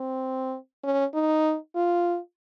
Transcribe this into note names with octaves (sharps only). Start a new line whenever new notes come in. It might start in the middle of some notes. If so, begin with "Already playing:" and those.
Already playing: C4
C#4
D#4
F4